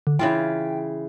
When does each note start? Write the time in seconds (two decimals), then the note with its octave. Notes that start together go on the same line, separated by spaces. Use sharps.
0.07 D3
0.19 C#3 E3 F4 G5